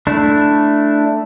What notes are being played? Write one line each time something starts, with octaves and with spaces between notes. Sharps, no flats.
A3 D4 E4